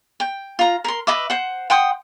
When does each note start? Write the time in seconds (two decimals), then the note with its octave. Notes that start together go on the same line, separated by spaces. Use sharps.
0.20 G5
0.59 F4 A#5
0.84 A#4 C6
1.07 B4 D#5 E5 D6
1.30 C5 F#5
1.70 F#5 G5 C6 D#6